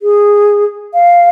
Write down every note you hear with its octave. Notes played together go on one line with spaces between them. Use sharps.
G#4
F5